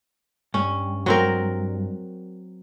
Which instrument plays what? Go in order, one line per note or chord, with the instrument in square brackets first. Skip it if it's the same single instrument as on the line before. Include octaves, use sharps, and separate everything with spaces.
[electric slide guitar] G2 [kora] C#4
[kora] F#3 C4 A#4